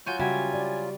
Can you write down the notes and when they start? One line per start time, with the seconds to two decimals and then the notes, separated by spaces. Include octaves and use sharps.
0.06 F#3 F4 F#4 G#5 G6
0.20 C#3 G3 F#4 E5 G#5
0.54 D5